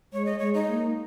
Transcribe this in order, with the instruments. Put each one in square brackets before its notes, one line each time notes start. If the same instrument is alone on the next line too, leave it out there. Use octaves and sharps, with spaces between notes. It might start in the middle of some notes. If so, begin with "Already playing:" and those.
[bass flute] G#3 [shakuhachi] C#5
[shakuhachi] D#5
[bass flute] G#3 [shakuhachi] C#5
[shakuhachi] D#4
[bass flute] A#3